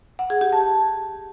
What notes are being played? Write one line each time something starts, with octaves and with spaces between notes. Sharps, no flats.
F#5
G#4
G4
A5